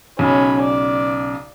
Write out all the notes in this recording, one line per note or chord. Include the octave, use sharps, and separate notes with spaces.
B1 C#3 C#4 B5
D5